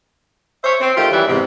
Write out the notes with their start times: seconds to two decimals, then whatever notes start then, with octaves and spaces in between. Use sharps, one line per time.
0.64 C5 C#5 E5
0.80 C4
0.96 D#3 A3 F4 G4
1.12 F#2 E3 G3 E5
1.27 E2 G#2 C3